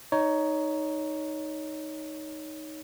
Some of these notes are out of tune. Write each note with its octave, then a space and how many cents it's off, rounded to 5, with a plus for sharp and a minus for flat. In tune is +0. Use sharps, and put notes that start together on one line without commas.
D#4 +0 C#5 +15